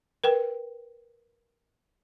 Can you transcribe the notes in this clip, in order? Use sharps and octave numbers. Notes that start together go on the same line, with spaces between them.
A#4 B4 G5